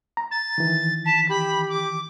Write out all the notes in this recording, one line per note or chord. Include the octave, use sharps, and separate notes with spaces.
A#5
A6
D#3 E3
A5 B6
G4 B5
D6